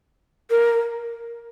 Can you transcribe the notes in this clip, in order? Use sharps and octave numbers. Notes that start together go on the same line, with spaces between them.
A#4